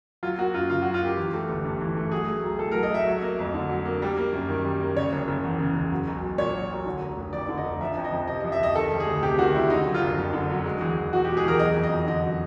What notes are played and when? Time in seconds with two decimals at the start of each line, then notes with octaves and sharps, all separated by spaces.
0.23 F#3 F4
0.38 A#3 F#4
0.53 F#2 F4
0.70 C#3 F4
0.82 F#4
0.85 F#3
0.94 F4
1.02 A#3 G4
1.17 E3
1.34 A3
1.49 G1
1.64 G2
1.80 E3
1.96 A3
2.11 F#3 G#4
2.27 A3
2.43 B1
2.59 A2 A4
2.71 A#4
2.75 F#3
2.83 D#5
2.92 A3 E5
3.06 F#3
3.22 A#3
3.39 F2
3.54 D3
3.69 F#3
3.85 A#3
4.02 G3
4.17 A#3
4.33 F#2
4.49 D#3
4.65 G3
4.80 A#3
4.96 C#3 C#5
5.13 F#1
5.28 F#1
5.44 E2
5.59 C#3
5.75 F#1
5.92 F#3
6.07 B1
6.22 B1
6.38 A#2 C#5
6.54 F#3
6.71 B1
6.86 D3
7.02 F1
7.18 F1
7.33 F2 D5
7.49 D3
7.57 D#5
7.64 F1
7.81 F3 E5
7.96 F2
8.04 D#5
8.12 F2
8.28 C3 D#5
8.41 D#5
8.44 F3
8.52 E5
8.60 F2 D#5
8.75 D#3 A4
8.92 G3
9.00 G#4
9.07 D2
9.23 C3 G4
9.39 D#3 F#4
9.55 G3 E4
9.70 D3 D#4
9.87 F#3
9.94 F4
10.02 F#1
10.17 F2
10.33 D3
10.50 F#3
10.66 G#3
10.81 E2
10.97 E2
11.13 B2 F#4
11.25 G4
11.29 G#3
11.37 G#4
11.44 E2 A#4
11.59 F#3 D#5
11.76 F2
11.83 D#5
11.91 F2
12.07 D3 D#5
12.23 F#3